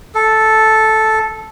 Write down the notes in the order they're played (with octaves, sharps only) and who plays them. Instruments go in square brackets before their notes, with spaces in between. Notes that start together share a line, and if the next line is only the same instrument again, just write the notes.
[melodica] A4